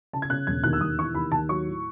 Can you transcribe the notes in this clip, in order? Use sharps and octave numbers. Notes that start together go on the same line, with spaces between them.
C#3 A5
G#6
C#3 F#6
E1 G#6
D#2 F#6
E6
E1 D#6
E3 C#6
D#2 B5
D#2 A5
F#3 C#6
A2